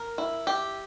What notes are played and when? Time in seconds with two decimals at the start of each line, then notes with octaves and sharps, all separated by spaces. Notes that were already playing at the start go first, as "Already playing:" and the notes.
Already playing: A#4
0.18 E4
0.47 G4